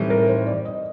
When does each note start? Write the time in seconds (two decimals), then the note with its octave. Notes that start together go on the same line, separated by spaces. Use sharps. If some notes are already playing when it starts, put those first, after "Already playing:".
Already playing: A2 E3 G3 C4 D#4
0.10 A#4
0.29 C5
0.47 D5
0.65 D#5